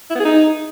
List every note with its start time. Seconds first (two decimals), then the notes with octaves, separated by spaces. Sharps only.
0.10 E4
0.15 B3
0.20 G#4
0.25 D#4